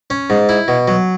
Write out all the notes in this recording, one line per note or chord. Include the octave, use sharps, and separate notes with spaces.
C#4
G#2
E4
B2
F#3